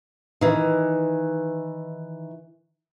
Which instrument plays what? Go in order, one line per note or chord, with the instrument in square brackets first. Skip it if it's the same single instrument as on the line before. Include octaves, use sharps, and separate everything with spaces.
[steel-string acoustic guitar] D#3 E3